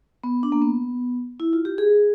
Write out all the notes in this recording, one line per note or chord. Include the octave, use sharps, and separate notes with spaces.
B3
D4
A#3
B3
E4
F4
G4
G#4